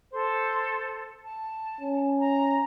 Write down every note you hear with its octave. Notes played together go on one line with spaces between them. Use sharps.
A4 C5
A5
C#4
A#5